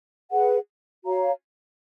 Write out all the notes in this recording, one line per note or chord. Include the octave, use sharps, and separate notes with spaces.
G#4 B4 F#5
F#4 C#5 F5 A#5